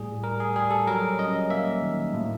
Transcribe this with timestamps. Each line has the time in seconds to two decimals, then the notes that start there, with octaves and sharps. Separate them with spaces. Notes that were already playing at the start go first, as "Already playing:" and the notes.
Already playing: A2 G3 G#4
0.23 G3 A#4
0.40 G#4
0.56 G3 G#4
0.71 A4
0.87 F#3 A#4
1.19 C#4 D#5
1.50 A#3 E5
1.82 D#3
2.14 A2